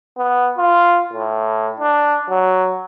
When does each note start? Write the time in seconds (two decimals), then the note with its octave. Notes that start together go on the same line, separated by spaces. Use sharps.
0.17 B3
0.58 F4
1.13 A2
1.80 D4
2.30 F#3